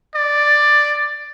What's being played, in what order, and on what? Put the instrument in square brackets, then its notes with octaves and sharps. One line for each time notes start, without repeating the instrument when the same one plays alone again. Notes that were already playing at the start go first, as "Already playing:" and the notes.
[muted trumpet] D5